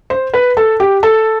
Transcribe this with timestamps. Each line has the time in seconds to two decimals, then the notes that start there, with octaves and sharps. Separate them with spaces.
0.10 C5
0.34 B4
0.57 A4
0.80 G4
1.03 A4